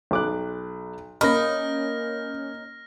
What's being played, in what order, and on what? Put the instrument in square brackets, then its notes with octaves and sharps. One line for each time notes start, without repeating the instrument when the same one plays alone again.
[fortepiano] B1 D6 F#6
[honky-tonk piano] A#3 C#4 [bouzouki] D#4 [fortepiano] B5 [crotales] F6 A#6